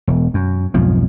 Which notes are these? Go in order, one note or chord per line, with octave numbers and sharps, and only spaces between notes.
E1
F#2
B1 F2 G#2 F3